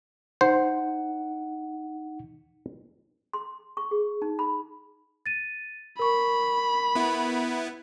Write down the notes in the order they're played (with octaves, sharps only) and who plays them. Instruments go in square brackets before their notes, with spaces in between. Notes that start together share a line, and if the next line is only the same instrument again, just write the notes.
[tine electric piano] D#4 F#5 [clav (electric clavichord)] C5
[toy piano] C6
C#6
G#4
D#4
B5
[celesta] A6 D#7
[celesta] A#4 C#6 [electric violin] B5
[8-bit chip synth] B3 E4